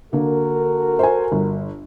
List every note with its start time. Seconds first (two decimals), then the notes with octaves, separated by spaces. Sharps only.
0.13 D3 A#3 F#4 A4 A#4
0.99 C5 G#5
1.32 G1